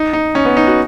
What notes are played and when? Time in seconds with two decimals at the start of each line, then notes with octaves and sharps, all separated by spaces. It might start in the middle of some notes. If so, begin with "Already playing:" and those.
Already playing: D#4
0.13 D#4
0.35 C#4
0.45 B3
0.57 D#4
0.67 F#4